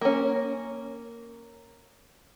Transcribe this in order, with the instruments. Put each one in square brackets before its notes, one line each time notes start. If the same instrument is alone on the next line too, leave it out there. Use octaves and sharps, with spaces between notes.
[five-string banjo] A#3 C#4